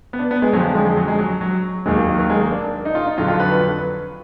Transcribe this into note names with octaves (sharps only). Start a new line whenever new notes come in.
B3
D4
B3
G#3
F2 D3 F3 F#3
G#3
G#3
G#3
F#3
G#3
F#3
F#3
D#2 D#3 F#3 G#3
A#3
A#3
F#3
G#3
A#3
D4
D#4
F4
D#4
F2 D3 F#3 F4
F4
B4